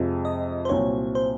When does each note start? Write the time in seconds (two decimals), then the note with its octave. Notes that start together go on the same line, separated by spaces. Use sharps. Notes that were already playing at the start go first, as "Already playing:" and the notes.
Already playing: F2 C3 F3 G#3
0.25 D#5
0.65 C5
0.69 C2 A#2 F#3 C4 F#4 C#5
1.15 C5